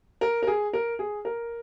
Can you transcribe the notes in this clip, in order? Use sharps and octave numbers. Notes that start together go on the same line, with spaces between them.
A#4
A#4
G#4
A#4
G#4
A#4